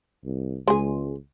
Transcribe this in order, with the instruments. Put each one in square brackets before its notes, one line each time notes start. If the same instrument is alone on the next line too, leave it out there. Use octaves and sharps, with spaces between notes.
[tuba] C2
[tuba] C#2 [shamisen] G#3 G#4